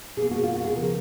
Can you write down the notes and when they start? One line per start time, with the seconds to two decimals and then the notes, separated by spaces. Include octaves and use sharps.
0.17 B2 A#3 G#4
0.31 F#4
0.43 F4
0.54 F#4
0.65 G#4
0.75 C#3 F3 B3 A#4